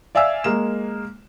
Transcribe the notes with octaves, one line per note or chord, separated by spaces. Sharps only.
D5 E5 F5 G#5 E6
G#3 A#3 E7